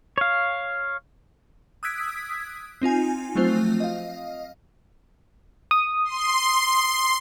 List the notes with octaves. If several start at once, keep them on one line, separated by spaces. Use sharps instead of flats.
C#5 F5
D#6 E6 F#6 G#6 B6 D7
C4 D#4 F4 G#5
F3 F#3 A3 C4 F4 C5
D#5 F5
D#6
C6